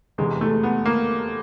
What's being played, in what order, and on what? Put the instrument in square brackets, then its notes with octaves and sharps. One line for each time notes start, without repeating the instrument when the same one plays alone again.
[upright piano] F1 E2 C3 E3 G#3
A3
B3
A#3